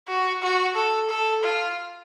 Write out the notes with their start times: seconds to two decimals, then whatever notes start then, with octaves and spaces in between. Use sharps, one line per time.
0.09 F#4
0.42 F#4
0.75 A4
1.09 A4
1.43 F4